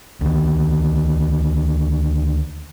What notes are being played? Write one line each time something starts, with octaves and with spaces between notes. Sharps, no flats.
D2 D#3